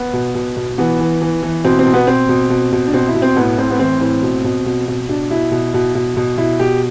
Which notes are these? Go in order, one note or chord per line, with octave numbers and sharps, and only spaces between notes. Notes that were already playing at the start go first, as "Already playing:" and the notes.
Already playing: B3
B2
B2
B2
E3 B3
E3
E3
E3
B2 C4
C4
B2
B3
B2 C4
B2
B2
B2
D4
B2 C4
E4
B2
C4
A2 B3
A2 C4
B3
E3 C4
A2 C4
B2
B2
B2
B2
B2 D4
B2 E4
B2
B2
B2
B2
B2 E4
B2 G4